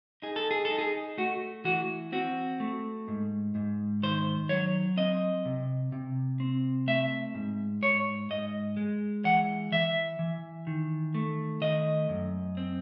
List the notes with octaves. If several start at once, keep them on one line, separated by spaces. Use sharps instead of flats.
D#4 G#4
A4
G#4
A4
D#4
G#4
A3 F#4
E3 F#4
C4 F#4
A3
G#2
G#2
D#3 C5
F#3 C#5
C4 D#5
C3
C3
C4
A3 E5
G#2
G#2 C#5
G#2 D#5
G#3
E3 F#5
E3 E5
E3
D#3
A3
D#3 D#5
F#2
C4